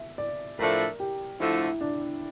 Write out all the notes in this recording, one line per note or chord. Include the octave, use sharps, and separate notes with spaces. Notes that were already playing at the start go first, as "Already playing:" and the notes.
Already playing: E5
D5
A2 F3 A3 D4 A#4
G4
D3 F3 A3 E4
D4